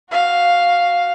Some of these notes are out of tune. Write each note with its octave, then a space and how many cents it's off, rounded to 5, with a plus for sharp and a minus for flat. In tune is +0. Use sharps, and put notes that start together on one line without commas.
F#4 +0 F5 +0